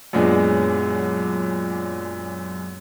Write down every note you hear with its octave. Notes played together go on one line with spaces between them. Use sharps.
F#2 A#2 G#3 B3 D4